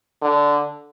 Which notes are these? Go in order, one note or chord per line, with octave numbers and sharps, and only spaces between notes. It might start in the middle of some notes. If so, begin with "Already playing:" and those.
D3